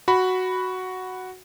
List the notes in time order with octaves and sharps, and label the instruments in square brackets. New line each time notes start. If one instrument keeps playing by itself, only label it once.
[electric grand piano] F#4 B5